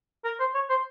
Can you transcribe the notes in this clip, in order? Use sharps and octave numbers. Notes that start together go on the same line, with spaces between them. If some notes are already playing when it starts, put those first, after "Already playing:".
A#4
C5
C#5
C5